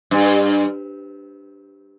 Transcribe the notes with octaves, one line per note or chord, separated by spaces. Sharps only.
G2